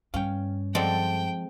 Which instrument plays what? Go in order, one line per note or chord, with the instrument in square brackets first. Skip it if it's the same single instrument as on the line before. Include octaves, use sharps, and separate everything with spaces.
[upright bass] G2 D3 [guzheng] C#4 [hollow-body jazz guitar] F5 G5
[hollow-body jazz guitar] F3 D5 F#5 [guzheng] G#3 C4 A4 [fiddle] G5